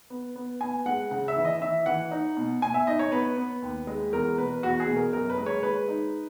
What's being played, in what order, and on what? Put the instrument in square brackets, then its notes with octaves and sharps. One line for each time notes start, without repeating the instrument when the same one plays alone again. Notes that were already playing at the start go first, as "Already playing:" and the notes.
[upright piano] B3
B3
B3 G#5
G#3 F#5
C#3 F#5
E5
E3
D#5
E3 E5
E3 F#5
D#4
B2
B2 G#5
E5
D#4 D#5
C#5
B3 B4
B3
D#2
G#3
E2 A#4
B2 B4
E2 F#4
G#4
B2
A#4
F#2 A#4
B4
G#3
C#5
G#3 B4
D#4